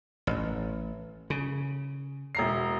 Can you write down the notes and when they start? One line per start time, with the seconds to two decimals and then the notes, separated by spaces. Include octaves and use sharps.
0.27 A1
1.30 C#3
2.35 E1 A#5 C7